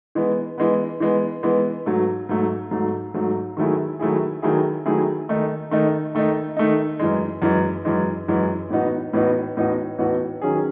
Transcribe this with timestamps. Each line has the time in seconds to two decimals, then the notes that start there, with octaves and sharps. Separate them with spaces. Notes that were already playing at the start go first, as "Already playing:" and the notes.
0.15 E3 G#3 B3
0.58 E3 G#3 B3
1.00 E3 G#3 B3
1.43 E3 G#3 B3
1.86 G#2 F#3 A3
2.29 G#2 F#3 A3
2.71 G#2 F#3 A3
3.14 G#2 F#3 A3
3.57 D#3 F#3 A3 E4 G#4
3.99 D#3 F#3 A3 E4 G#4
4.42 D#3 F#3 A3 E4 G#4
4.86 D#3 F#3 A3 E4 G#4
5.29 D#3 A3 D#4
5.71 D#3 A3 D#4
6.15 D#3 A3 D#4
6.57 D#3 A3 D#4
6.99 F#2 E3 G#3
7.42 F#2 E3 G#3
7.85 F#2 E3 G#3
8.28 F#2 E3 G#3
8.70 A2 E3 B3 D#4 F#4
9.13 A2 E3 B3 D#4 F#4
9.57 A2 E3 B3 D#4 F#4
9.98 A2 E3 B3 D#4 F#4
10.42 D#3 F#3 C#4 G#4